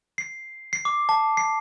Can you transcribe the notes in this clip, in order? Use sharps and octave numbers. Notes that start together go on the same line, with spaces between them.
C7
C7
D6
A5
C7